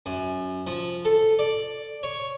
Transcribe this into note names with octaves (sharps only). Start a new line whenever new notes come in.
F#2
F3
A4
D5
C#5